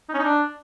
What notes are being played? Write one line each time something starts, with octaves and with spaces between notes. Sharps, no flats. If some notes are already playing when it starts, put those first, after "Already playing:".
D#4
C#4
D#4
D4